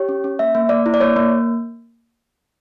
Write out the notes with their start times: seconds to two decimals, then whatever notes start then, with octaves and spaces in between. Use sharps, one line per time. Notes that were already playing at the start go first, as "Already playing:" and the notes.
Already playing: G4 C#5
0.09 C#4
0.24 C#4
0.39 A#3 E5
0.55 A#3
0.69 A#3 D5
0.86 E4
0.94 D5
1.01 A#3 C#5
1.16 A#3